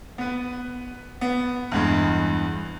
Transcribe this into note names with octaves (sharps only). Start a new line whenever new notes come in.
B3 B4
B3
E2 G2 G#3